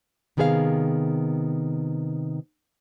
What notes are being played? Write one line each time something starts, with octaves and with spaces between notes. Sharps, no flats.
C3 D#3 B3 G#4 B4 F5